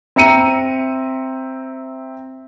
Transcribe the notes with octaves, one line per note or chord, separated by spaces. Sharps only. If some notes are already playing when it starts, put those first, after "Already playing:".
C4 E5 A#5 C#7 D#7